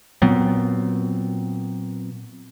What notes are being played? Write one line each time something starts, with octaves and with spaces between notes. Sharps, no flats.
A#2 F#3 B3 C4